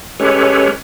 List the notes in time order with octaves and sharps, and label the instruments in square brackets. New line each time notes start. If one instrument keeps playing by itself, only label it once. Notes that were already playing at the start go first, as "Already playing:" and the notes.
[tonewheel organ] G#3 C#4 G4 A4 B4 C#5